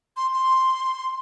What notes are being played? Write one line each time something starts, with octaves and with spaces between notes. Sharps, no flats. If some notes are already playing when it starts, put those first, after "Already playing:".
C6
C6